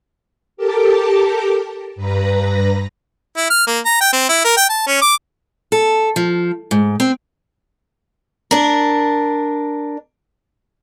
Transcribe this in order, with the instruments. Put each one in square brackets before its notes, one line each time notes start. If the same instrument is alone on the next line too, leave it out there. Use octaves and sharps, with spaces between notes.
[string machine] G4 A4 A#4 A5 D6
G2 B4 A#5 A#6
[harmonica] E4
F6
A#3
A#5
G5
C4
E4
A#4
G5
A5
C#4
D6
[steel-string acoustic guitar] A4
F3
G#2
C4
D4 A#4